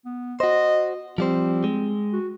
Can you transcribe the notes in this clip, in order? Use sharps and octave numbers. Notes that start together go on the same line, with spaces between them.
B3
F#4 C5 D#5
F3 G3 C4 C5
G#3
F#4